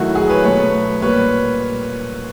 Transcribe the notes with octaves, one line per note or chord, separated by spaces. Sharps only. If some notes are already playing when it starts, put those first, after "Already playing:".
Already playing: D#3 F#3 A3 E4 F#4
F#4 G#4
B4 C#5
B2 F#3 A3 B4 C#5
A#2 G3 A#3 B4 C#5